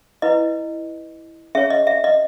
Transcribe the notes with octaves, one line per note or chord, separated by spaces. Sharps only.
E4 B4 D#5
C#4 G#4 C#5 E5
D#5
E5
D#5